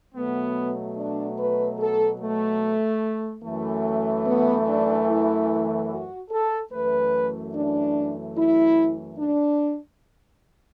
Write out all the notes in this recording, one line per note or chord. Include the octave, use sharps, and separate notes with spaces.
B2 F#3 A3 B3
D4
B4
A4
A3
F#2 E3 A3
B3
D4
E4
F#4
A4
F#2 E3 A3 B4
D4
E4
D4